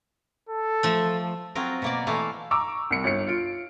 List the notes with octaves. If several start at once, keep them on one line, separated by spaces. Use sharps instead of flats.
A4
F3 A3
F#3 C4 F4 A#4
B2 A#3 D5
E3 A3 F5
A#5 C#6 D6 E6
C2 C#7
G1 C#7
F4 D7